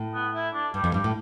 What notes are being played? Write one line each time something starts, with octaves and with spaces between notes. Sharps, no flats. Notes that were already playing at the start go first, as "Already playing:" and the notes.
Already playing: A2
B3
E4
D4
G2 G3
F2
G2 G3
A2